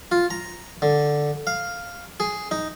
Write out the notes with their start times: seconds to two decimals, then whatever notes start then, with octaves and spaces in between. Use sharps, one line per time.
0.11 F4
0.31 A#5
0.82 D3
1.47 F5
2.20 G#4
2.51 D#4